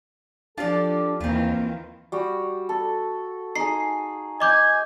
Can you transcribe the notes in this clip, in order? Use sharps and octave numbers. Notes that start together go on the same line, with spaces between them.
F3 D4 F4 G4 A4 D5
D#2 D#3 E3 A#3 C4 F4
G3 F#4
A4
D#4 G#4 C7
D#5 G#5 D6 G6